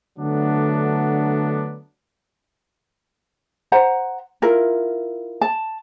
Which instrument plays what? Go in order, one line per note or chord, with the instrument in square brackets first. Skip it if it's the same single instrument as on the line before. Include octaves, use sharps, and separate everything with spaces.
[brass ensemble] D3 F#3 A3 B3 D4
[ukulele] C5 F#5 A#5
E4 F4 A#4
A5